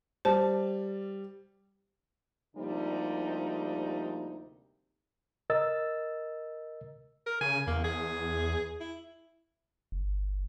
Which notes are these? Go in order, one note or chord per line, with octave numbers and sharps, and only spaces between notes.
G3 C5 A5
D2 C3 F3 G3 A#3 D#4
A#4 D#5 E6 A6
A#4
C#3 G#5
E2 A#3
G#4
E4
G1